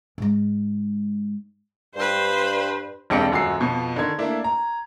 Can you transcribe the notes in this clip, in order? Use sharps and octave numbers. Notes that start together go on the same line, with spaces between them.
G#2 G#3
G2 B4 C5
E1 B1 C4 D4 G4 C#7
D#1 F#2 F#4 E6 C7
F2 B2 F3
D3 D#3 G#6
A3 A#3 D4 E4
A#5